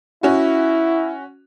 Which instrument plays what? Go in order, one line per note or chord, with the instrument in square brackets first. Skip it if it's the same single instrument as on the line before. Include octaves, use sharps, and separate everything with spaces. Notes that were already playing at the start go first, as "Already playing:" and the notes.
[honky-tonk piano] C#4 F#4 [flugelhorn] E4